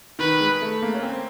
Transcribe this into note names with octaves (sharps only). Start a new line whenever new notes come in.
D#3 B4
G#3
A3
A#3
C#4
C4